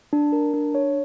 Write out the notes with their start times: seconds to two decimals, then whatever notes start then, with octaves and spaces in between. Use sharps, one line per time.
0.13 D4
0.32 A#4
0.54 D4
0.75 C#5